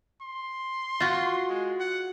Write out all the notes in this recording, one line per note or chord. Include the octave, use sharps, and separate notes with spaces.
C6
F4 F#4
G#3
F#5